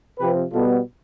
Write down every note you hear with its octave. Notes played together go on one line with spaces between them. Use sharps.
C3 F3 C4 G4 B4
B2 G3 B3 F4 A4